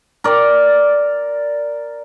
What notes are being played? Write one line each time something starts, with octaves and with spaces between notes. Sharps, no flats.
A#4 D5